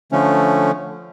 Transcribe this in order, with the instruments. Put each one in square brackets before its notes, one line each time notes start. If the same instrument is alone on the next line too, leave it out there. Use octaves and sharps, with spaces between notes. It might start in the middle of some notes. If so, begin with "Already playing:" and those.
[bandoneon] D3 F3 A3 C#4